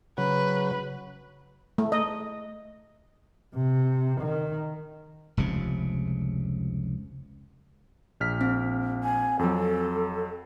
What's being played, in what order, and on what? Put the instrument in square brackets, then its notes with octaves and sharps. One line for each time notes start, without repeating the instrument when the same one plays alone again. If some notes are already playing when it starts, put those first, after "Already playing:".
[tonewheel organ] C#3 F#3 [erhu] B4
[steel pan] A3
D#5
[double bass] C3
D#3
[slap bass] F1 C#2 C3
[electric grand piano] A#1 F6 B6
[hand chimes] C4
[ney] G#5
[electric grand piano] F2 F#3 [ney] A4